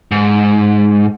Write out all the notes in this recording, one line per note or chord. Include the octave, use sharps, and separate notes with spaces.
G#2